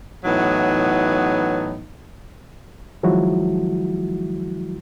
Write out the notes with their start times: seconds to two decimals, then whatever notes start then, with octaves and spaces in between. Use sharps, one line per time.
0.24 A2 E3 F#3 B3 D#4
3.03 D#3 F3 F#3 G#3 E4 F#4